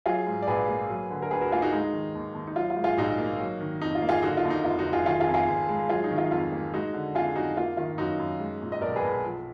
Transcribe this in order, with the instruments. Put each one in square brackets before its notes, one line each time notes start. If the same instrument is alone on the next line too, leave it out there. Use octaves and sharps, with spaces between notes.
[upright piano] F#3 F4 G#4
G#2
D5
A#1 G#4 B4
A#3
F#3
D3
A#4
D2 G#4 B4
F#4 A#4
A#3 F4 G#4
D#4 F#4
G#3 D#4
D#3
D#2
D#2
D#4
F#3 F4
F4
G#2
F4 G#4
A#1 D#4 F#4
A#3
F#3
D#3
F2 D#4
F4
A#3
F4 G#4
D3 D#4 F#4
F4
D#2
D#4
F1 F4
D#4 F#4
F1
F4 G#4
D#3 F4 G#4
F4 G#4
F2
F4 G#4
F1
G#3
F#3 F4 G#4
D#4
D#3
F4
F2 F4
A#3
G#3 D#4 F#4
D3
F2 F4 G#4
F2 D#4 F#4
A#3 F4
D#3 F4
F#2 D#4 F#4
F#2
G#3
A#2
D#5
B1 A#4 D5
G#4 B4
B1
F3